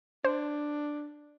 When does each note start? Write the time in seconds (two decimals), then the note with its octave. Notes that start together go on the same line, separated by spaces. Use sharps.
0.25 D4 C5